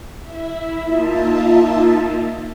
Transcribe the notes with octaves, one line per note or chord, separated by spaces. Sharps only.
E4 E5
A#3 D#4 F4 E5 A5